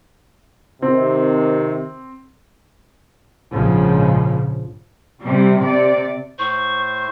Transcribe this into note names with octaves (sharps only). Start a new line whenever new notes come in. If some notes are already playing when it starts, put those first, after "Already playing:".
C3 D#3 C4
A#1 G#2 C#3 F3
C3 G3
C3 D5
A2 C5 C#6